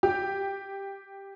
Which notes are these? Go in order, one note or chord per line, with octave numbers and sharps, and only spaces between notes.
G4